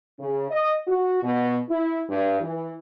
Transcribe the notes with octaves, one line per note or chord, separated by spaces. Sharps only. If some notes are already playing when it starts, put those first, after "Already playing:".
C#3
D#5
F#4
B2
E4
G2
E3